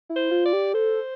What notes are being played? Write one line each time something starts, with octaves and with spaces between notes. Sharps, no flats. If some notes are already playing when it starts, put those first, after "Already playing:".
E4
C5
F4
D5
G4
A4 C5